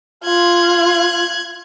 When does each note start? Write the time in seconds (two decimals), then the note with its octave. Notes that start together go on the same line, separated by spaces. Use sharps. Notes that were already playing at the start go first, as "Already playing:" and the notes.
0.24 F4 F#6 G#6